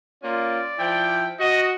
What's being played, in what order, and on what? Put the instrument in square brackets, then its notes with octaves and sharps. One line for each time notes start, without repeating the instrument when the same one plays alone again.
[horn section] A#3 C#4 F4 [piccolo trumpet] D5
[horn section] F3 E4 G5
[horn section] F#4 [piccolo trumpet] D#5